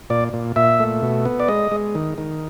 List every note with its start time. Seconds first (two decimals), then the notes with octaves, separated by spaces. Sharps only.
0.10 A#2 D5
0.33 A#2
0.56 A#2 E5
0.80 A3
1.03 B2
1.25 B3
1.40 D5
1.48 G#3 D#5
1.72 G#3
1.95 D#3
2.18 D#3